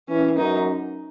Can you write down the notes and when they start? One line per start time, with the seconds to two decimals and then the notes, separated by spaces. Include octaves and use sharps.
0.09 E3 C#4
0.37 F#2 D#4